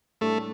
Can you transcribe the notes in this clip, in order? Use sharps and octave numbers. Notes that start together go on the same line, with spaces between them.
A2 G3 A3 D4